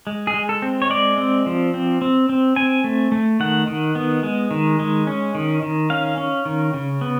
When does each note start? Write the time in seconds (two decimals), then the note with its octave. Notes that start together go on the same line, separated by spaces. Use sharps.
0.07 G#3
0.27 G#4
0.34 G#3
0.49 A4
0.62 C4
0.82 C#5
0.89 G#3 D5
1.18 C4
1.46 F3
1.74 C4
2.02 C4
2.29 C4
2.56 C4 G#5
2.84 A3
3.12 A3
3.40 D#3 F#5
3.67 D#3
3.95 B3
4.23 G#3
4.51 D#3
4.79 G#3
5.07 C#4
5.35 D#3
5.63 D#3
5.90 C#4 F5
6.18 C#4
6.45 D#3
6.74 C#3
7.01 B3